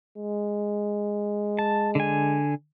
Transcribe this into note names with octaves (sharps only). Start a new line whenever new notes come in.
G#3
A5
D3 G#5